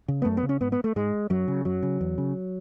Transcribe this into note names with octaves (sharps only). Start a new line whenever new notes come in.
C#3
B3
F#2 A3
B3
C#3
C#4
G#2 B3
B3
A3
G#2 G#3
F#2 F#3
C#3
F#2 F#3
C#3
E2
C#3